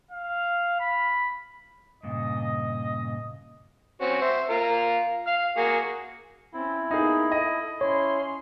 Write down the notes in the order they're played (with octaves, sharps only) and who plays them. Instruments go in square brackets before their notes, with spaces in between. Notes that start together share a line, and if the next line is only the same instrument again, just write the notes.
[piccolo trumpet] F5
B5
[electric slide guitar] G2 A#2 C#3 [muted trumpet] D#5
[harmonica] C4 C#4 F#4
C5 E5
F4 A#4 F5
F5 F6
A#3 F#4 G#4
[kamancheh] C4 C#4 [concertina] E4
[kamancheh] A#3 B3 [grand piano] D#4 G#4
[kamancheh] A4 [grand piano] D#5
[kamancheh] C#4 C6 [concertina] E4 [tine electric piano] C#5